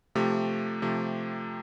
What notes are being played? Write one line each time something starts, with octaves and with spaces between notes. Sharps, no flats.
C3 F3 A3 G4
C3 F3 A3